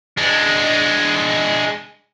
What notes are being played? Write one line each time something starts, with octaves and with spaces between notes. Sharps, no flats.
G#3 D4